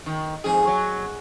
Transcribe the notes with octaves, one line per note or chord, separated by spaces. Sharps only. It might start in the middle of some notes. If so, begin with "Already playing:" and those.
D#3
F2 G#2 G#4
F#3